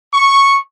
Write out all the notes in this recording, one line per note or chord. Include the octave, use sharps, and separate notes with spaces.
C#6